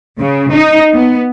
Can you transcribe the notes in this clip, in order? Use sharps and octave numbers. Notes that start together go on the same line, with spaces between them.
C#3
D#4
B3